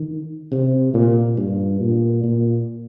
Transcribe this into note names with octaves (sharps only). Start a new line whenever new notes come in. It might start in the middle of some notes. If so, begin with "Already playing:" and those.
Already playing: D#3
C3
A#2
G2
A#2
A#2